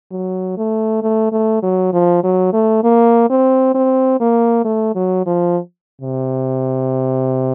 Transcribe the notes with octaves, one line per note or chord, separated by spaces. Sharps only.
F#3
A3
A3
A3
F#3
F3
F#3
A3
A#3
C4
C4
A#3
A3
F#3
F3
C3